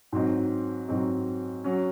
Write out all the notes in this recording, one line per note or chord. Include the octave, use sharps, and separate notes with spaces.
G#2 F#3 C4 D#4
G#2 F#3 C4 D#4
F#3 C#4